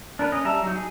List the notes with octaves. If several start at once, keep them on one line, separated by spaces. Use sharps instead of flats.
D4 A#4 B4
C#4 D#5
G3 E5 A5 A#5
F#3 D#4
G#4